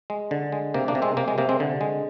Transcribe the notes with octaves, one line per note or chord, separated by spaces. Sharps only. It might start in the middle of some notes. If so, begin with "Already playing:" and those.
G#3
D3
G#3
C3 A#3
A#3 D4
C3
G#3 C4
C3 A#3
G#3
C3 A#3
G#3 C4
D3
G#3